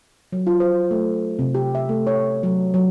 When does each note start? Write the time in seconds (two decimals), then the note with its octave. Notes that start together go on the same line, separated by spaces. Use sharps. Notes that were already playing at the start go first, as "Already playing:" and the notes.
0.32 F#3
0.47 F4
0.60 C5
0.91 A3
1.39 C3
1.55 G4
1.75 E5
1.89 A3
2.07 C#5
2.43 F#3
2.74 F#3